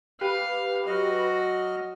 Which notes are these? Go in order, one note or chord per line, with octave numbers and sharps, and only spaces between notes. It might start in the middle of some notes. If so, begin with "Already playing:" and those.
G4 B4 F5
F#3 F#4 D#5 F6